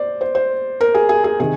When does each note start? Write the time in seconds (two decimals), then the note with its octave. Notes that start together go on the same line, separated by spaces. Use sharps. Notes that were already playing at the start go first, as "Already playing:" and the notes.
Already playing: C5 D5
0.21 C5
0.35 C5
0.81 A#4
0.95 G#4
1.09 G#4
1.24 G#4
1.40 C3 D#3 G#4